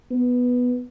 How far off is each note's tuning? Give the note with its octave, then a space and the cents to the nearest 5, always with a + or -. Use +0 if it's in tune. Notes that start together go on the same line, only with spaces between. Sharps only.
B3 +0